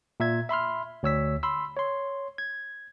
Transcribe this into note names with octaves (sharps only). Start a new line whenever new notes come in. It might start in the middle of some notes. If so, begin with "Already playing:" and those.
A#2 E5 G#6
E5 B5 C6 F6
D2 C#5 E6 B6
B5 C6 E6
C#5 C6
G#6